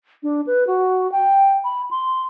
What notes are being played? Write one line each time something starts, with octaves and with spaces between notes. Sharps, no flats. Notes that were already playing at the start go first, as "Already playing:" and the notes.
D4
B4
F#4
G5
B5
C6